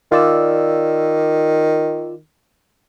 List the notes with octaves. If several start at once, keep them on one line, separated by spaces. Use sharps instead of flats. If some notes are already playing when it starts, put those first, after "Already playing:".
D#3 F4 D5 E6